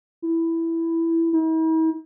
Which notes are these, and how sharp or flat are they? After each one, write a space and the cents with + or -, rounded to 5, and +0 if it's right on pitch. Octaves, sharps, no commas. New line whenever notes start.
E4 +5
E4 -45